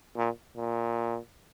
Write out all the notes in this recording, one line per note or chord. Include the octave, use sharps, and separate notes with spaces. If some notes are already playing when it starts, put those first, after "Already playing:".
A#2
A#2